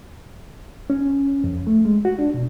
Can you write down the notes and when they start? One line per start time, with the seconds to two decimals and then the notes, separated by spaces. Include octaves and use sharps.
0.90 C#4
1.44 F2
1.67 A3
1.85 G#3
2.05 F#4
2.19 D4
2.34 B2